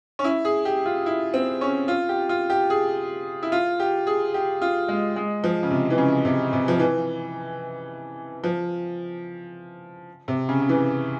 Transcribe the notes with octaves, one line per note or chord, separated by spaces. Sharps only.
C#4
E4
G#4
G4
F4
E4
C4
C#4
F4
G4
F4
G4
G#4
E4
F4
G4
G#4
G4
F4
G#3
G#3
F3
C#3
C3
E3
C#3
C3
C3
F3
E3
F3
C3
C#3
C#3
E3